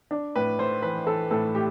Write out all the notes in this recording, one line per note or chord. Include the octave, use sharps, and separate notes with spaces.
D4
A2 B4
A3 C5
E3 B4
E3 A4
A2 A4
A2 G4